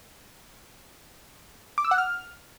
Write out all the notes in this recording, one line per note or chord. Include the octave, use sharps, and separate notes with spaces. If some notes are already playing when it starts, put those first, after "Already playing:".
D6
E6
F#5
F6